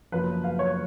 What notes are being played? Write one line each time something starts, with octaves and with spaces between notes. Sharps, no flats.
F#1 F#2 F3 B4
F5
C#5